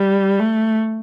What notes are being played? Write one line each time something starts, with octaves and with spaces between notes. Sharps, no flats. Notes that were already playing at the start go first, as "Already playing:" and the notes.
Already playing: G3
A3